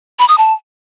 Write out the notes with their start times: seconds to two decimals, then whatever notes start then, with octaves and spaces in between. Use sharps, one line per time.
0.19 B5
0.29 D#6
0.38 A5